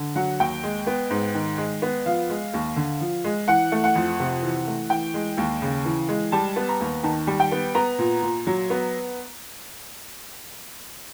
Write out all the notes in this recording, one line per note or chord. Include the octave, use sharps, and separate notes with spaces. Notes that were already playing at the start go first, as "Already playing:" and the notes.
Already playing: D3
F#3 F#5
D#2 G5
G#3
B3
G#2
D#3
G#3
B3
F3 F5
G#3
D#2
D3
F3
G#3
E3 F#5
A3
F#5
F2
C3
E3
A3
E3 G5
G#3
D#2
C#3
E3
G#3
G3 A5
B3
A#5
D#2
D#3 A5
G3
G5
B3
B3 A#5
A#2
A#2
F#3
B3